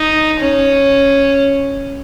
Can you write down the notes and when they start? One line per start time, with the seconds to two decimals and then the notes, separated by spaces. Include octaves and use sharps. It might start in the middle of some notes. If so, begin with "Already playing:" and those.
Already playing: D#4
0.39 C#4